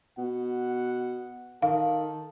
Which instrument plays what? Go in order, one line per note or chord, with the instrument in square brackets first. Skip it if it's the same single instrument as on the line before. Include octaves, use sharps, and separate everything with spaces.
[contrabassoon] B2 [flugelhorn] F#5
[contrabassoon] D#3 [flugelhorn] A4 [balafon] F5